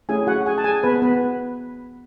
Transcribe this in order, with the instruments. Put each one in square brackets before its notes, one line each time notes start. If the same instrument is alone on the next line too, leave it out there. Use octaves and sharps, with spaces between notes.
[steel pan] A3 C#4 E4 G#4 G#5
F#4 F#5
G#4 G#5
A5
G#4 G#5
B3 B4
B3 B4